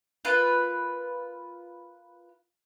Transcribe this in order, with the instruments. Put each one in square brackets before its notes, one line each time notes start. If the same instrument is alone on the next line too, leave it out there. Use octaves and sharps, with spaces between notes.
[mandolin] F4 A#4 B4